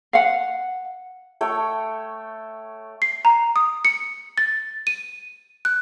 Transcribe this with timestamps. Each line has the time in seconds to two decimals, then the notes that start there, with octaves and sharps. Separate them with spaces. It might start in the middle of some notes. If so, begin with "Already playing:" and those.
0.13 F5 F#5
1.41 A3 C#5 G5
3.02 C7
3.25 A#5
3.56 D#6
3.85 C#7
4.38 A6
4.87 D#7
5.65 F#6